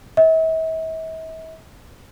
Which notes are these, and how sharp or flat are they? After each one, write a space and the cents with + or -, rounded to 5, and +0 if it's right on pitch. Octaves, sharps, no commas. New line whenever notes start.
E5 -45